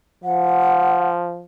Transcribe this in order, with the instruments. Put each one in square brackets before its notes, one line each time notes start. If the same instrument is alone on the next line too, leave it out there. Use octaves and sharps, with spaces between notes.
[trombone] F3 [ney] F#5